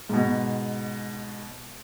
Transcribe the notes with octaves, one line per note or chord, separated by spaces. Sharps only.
G#2 B2